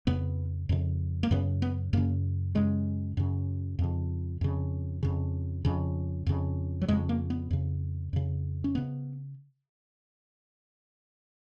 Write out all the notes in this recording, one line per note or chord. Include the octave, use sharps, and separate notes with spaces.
F2 C#3 B3
F2 C#3
A#3
F#2 C#3 B3
B3
F#2 C#3 A#3
F#2 C#3 G#3
F#2 C#3
F2 C#3
F2 C#3
F2 C#3
F2 C#3
F2 C#3
F#3
F2 C#3 G#3
A#3
B3
F2 C#3
F2 C#3
C#4
C#3 B3